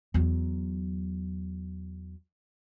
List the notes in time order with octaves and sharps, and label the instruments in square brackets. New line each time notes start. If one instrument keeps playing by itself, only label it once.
[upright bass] E2 F#3